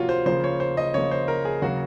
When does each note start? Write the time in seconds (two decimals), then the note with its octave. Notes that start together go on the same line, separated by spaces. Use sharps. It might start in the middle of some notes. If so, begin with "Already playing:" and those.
Already playing: C3 F3 A#3 F4 F#4 C#5
0.09 C5
0.26 C#3 F3 A#3 C5
0.44 C#5
0.60 C5
0.77 D#5
0.94 C#3 F3 A#3 C#5
1.11 C5
1.28 A#4
1.45 G#4
1.62 C#3 F#3 A#3 F#4